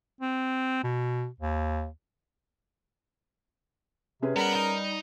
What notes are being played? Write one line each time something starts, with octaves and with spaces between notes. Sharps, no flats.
C4
B2
D#2
C3 C#4 G#4 B4
G3 B3 A#4 F#5
D#4